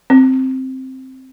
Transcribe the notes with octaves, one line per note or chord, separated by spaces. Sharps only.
C4